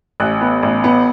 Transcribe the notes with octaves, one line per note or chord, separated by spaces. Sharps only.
A1 F#6
B3
A1
B3